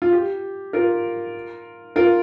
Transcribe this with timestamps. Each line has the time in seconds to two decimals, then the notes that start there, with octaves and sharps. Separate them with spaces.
0.02 F4
0.13 G4
0.73 F4 A#4
1.96 F4 A#4